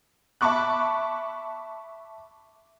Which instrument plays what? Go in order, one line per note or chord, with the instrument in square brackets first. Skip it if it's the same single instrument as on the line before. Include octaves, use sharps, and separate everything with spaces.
[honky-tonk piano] E5 A5 B5 C#6 D6 F#6